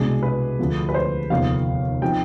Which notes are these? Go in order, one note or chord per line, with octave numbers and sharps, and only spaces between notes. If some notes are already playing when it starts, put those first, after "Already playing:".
Already playing: C2 B2 G#3 D4 G#4
B4
D2 D3 F3
B4
C5
F1 D#2 D3 F3 B3 F5
F3 C4 D#4 G5